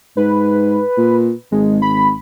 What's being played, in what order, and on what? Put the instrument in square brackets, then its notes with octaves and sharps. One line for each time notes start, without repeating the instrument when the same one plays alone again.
[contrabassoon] G#2 [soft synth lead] B4
[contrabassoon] A#2
[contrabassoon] G#1 [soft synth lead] G#3
[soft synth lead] B5